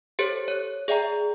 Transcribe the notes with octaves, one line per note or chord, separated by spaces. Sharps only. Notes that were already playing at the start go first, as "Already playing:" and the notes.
G4 A4 C5 C#5
C#5 F#6
G#4 D5 E5 G5 A#5